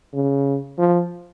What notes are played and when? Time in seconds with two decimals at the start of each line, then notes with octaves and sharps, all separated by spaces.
0.13 C#3
0.79 F3